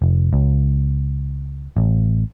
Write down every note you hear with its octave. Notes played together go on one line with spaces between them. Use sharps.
F1
C#2
A1